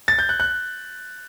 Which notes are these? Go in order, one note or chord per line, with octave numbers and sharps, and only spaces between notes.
A6
G6
F#6
F#6